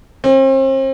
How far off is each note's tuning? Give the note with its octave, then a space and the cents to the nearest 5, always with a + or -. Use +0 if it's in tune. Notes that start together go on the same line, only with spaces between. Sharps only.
C4 +40